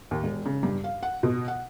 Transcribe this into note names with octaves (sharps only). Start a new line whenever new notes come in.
D#2
E1
C#3
G2
F5
F#5
B2
F#5